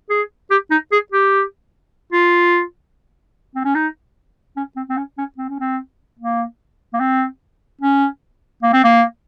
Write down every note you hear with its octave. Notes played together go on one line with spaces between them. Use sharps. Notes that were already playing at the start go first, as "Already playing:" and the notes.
G#4
G4
D#4
G#4
G4
F4
C4
C#4
D#4
C#4
C4
C4
C#4
C#4
C4
C#4
C4
A#3
A#3
C4
C#4
A#3
C4
A#3